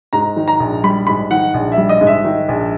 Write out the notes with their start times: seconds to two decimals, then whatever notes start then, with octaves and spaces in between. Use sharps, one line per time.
0.13 G#2 A#5
0.37 D#3
0.48 A#5
0.60 A#1
0.83 G3 B5
1.07 G#2 B5
1.31 D#3 F#5
1.54 A#1
1.72 E5
1.77 G3
1.89 D#5
2.01 G#2
2.07 E5
2.25 D#3
2.48 A#1